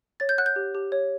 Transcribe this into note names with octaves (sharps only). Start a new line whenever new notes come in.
C#5 A6
G6
F#5 F#6
G6
G4
G4
C#5